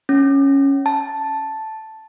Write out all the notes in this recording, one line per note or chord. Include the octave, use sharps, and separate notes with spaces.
C#4
A5